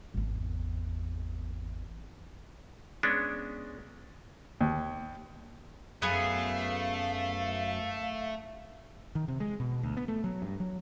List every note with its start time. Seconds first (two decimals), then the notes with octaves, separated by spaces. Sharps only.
0.14 G#1 E2
3.03 G#3 B3 C#4 D4
4.61 D#2
6.02 F#2 A3 B3 G#4 F5
9.15 D#3
9.28 C3
9.40 G#3
9.60 B2
9.83 D2
9.97 B3
10.08 A3
10.24 F#3
10.42 G2
10.60 F#3